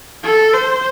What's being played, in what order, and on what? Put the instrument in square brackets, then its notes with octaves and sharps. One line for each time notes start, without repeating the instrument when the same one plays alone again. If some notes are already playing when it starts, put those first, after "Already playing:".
[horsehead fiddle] A4
C5